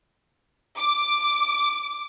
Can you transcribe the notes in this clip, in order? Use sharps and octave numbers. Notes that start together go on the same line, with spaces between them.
D6